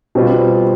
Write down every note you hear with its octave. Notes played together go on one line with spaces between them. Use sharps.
B2 G3 C4 F4